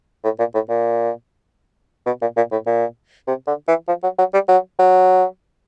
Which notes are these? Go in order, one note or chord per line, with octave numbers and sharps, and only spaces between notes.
A2
A#2
A2
A#2
B2
A#2
A#2
A2
A#2
C3
D3
E3
F3
F#3
F#3
G3
F#3
F#3